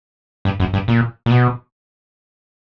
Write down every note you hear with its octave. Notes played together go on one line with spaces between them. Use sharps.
G2
F#2
G2
A#2
A#2
B2